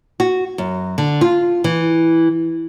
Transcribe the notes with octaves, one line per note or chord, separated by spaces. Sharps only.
F#4
F#2
D3
F4
E3